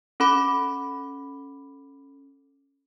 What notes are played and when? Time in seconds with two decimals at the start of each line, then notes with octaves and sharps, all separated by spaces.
0.20 C#4 A4 B5 D6